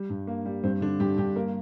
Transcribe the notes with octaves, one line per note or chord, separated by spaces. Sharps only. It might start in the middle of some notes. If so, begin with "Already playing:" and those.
Already playing: G3
G2
A#3
G3
G2 C4
D3 D4
G2 G4
G2 G4
A#3 A#4